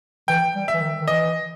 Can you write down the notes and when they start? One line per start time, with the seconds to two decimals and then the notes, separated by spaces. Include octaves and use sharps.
0.28 E3 G5
0.55 G3
0.68 E5
0.73 E3
0.81 D#3
1.01 D#3
1.07 E3 D#5